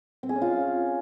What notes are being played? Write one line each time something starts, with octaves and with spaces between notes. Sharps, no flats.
C4
G#4
C#4
F4